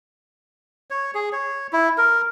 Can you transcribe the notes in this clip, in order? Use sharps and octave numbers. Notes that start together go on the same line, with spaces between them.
C#5
G#4
C#5
E4
A#4